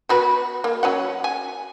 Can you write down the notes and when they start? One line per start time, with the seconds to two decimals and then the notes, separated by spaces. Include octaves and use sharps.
0.09 B3 F#4 B4
0.64 A#3
0.83 F#3 C#4 F#5
1.24 G#5